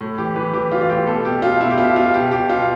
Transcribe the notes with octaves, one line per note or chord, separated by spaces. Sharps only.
A2
E3 G4
E3 B4
E3 G4
E3 F4
F4
A2 G4
B2 A4
B2 G4
B2 F4
B2 E4
G4
B2 F4
B2 F4
B2 G4
B2 G4
B2 F4